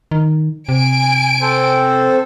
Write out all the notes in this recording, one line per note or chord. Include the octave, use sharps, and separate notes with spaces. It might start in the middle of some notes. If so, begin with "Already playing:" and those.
D#3
C3 G#5 D7
C4 A4 C5